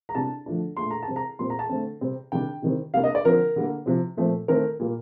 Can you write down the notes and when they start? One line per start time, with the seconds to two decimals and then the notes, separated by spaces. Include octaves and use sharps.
0.09 A#5
0.15 C3 G3 D4 A5
0.46 D3 F3 A3 D4
0.77 A#2 A3 D4 C6
0.91 A#5
1.02 A5
1.08 C3 G3 C4
1.16 A#5
1.39 A#2 G3 C4 C6
1.50 A#5
1.59 A5
1.69 D3 A3 C4
2.01 C3 G3 C4
2.32 C3 D#3 G3 D4 G5
2.62 C3 D#3 G3 C4
2.94 C3 G3 A#3 D4 F5
3.04 D#5
3.15 D5
3.25 D3 F3 C4 A#4
3.56 D3 G3 A#3
3.86 C3 F3 C4
4.17 A#2 F3 A3 C4
4.48 D#3 A3 C4 A#4
4.80 A#2 G3 A#3